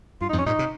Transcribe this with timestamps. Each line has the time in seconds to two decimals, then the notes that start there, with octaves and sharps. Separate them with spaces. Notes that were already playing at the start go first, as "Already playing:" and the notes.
0.21 G2 F4
0.29 D#4
0.33 F2 G#2
0.38 C#4
0.46 G2 A#2 D#4
0.59 C3